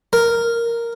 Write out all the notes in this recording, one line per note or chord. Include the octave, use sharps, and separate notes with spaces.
A#4